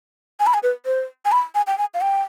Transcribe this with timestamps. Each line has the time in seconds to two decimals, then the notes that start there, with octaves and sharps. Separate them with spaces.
0.40 G#5
0.46 B5
0.54 G#5
0.63 B4
0.86 C5
1.25 G#5
1.32 B5
1.55 G#5
1.67 G5
1.78 G#5
1.94 F5
2.01 G5